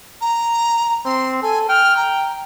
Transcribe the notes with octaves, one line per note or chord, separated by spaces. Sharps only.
A#5
C4 C6
A4 G#5
G5 F6
A#5